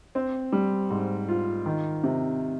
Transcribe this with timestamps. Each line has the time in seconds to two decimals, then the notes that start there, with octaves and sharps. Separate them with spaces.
0.15 C4
0.52 G3
0.90 G#2
1.28 F4
1.66 D#3
2.03 C3